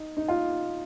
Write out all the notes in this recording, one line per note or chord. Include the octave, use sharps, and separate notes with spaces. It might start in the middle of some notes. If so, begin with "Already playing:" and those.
Already playing: D#4
D#4
F4